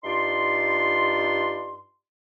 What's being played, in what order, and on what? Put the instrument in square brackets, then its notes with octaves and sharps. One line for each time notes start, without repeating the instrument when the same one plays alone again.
[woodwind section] G2 D#4 F4 D5 C6